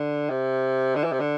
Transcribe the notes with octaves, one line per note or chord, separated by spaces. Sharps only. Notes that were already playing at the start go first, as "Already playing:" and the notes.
Already playing: D3
C3
D3
E3
C3
D3